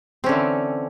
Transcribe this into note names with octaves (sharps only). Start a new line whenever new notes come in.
D3 E3 C4 C#4